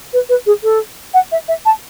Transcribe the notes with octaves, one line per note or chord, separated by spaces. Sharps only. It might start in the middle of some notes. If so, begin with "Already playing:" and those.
B4
B4
G#4
A4
F#5
E5
E5
A5